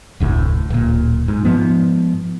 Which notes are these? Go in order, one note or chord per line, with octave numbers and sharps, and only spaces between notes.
F1 D2 A2
D1 A#2
G#2
G#2 F3 B3